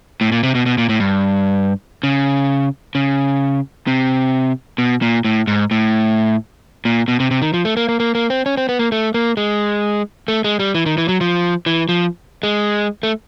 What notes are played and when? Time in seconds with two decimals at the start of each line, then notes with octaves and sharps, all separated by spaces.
0.21 A2
0.32 A#2
0.43 C3
0.55 B2
0.66 B2
0.78 A#2
0.89 A2
1.00 G2
2.03 C#3
2.95 C#3
3.87 C3
4.78 B2
5.02 A#2
5.25 A2
5.47 G#2
5.71 A2
6.85 A#2
7.08 B2
7.20 C3
7.31 C3
7.42 D#3
7.54 F3
7.65 A3
7.77 A#3
7.89 A#3
8.00 A#3
8.15 A#3
8.30 C4
8.46 C#4
8.57 C4
8.69 B3
8.79 A#3
8.92 A3
9.14 A#3
9.37 G#3
10.28 A3
10.44 G#3
10.60 G3
10.75 E3
10.86 D#3
10.98 E3
11.09 F#3
11.21 F3
11.66 E3
11.89 F3
12.43 G#3
13.03 A3